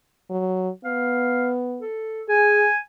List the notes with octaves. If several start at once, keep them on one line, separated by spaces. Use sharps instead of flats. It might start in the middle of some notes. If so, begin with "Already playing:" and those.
F#3
B3 F5
A4
G#4 G#5